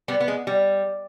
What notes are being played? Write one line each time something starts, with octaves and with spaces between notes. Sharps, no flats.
G3 B3
B3
G#3
G3